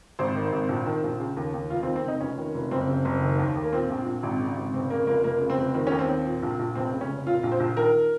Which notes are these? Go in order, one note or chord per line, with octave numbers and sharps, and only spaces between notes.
G#1 C5
D#3
G#1
A#1
D#3
A#1
C#3
D#2
D#2
F1 F4
C4
D#3
C4
F1 D#4
F1 C#4
D#3
F1
F#1 C4
C#3
F#1
D#3
D#2
D#2
A#3
A#2 C4
A#1
A#1
G#1
C#3
G#1
F1 C4
C#3 A#3
F1 A#3
F1 A#3
C#3
C4
F1
D#3 C4
D#2 C#4
C4
D#2
A#2
A#1
A#1
F1 C4
C#3
C#4
F1
A#2 F4
A#1
C5
A#1
D#3 A#4